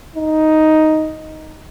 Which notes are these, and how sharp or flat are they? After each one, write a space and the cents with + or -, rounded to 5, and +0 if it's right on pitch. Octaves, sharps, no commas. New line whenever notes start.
D#4 +5